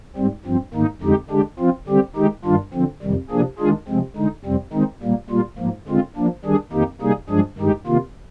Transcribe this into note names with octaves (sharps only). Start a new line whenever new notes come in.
G#2 G3 C4
G2 F3 C4
G#2 D#3 A#3 D#4
F2 D3 G#3 D#4 G4
D3 G#3 D4 G4
F3 C4 F4
D3 G3 C4 G4
D#3 G#3 D#4 G4
G2 D#3 G3 D4 F4
D3 F3 C4
F2 C3 D#3 G3
C3 F3 A#3 D4 G#4
D#3 G#3 D4 F4 G#4
C3 F3 G#3 C4
D3 G#3 D#4
F2 C3 G3 C4
D#3 G#3 C4 D#4
A#2 G3 A#3
A#2 G3 A#3 F4
G#2 F3 A#3
D3 G#3 C4 F4
F3 A#3 D4
D#3 G3 D4 G#4
F2 D#3 A#3 D#4 G4
C3 G3 A#3 D#4 G#4
G2 F3 G#3 D4 G#4
G2 D#3 G#3 D#4 G4
C3 D#3 A#3 F4